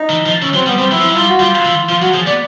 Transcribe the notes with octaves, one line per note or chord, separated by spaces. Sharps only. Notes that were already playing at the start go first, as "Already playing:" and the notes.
Already playing: D#4
E3
F3
E3 C#4
F#3 C4
G3 B3
G3 C4
F#3 E4
F3
F#3 E4
G3 F4
F#4
G3 F4
E3
F3 F4
F#3 F#4
F3 G#4
B3 D5